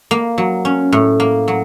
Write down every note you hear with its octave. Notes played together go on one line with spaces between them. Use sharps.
A#3
F#3
C#4
A2
A#3
F#3